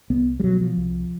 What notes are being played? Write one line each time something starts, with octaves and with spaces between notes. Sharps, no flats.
C2 B3
G3
B2 F#3
F3
C2